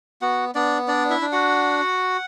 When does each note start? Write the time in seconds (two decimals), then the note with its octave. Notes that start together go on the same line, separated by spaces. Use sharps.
0.22 B3 F#4 F#5
0.55 B3 D4 D5
0.88 D4 D5
1.10 E4 E5
1.21 D4
1.32 F#4 F#5